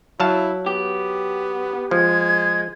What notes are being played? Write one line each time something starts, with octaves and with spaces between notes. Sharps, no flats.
F#3 E4 F5 A5
B3 G4
F3 G#3 G#6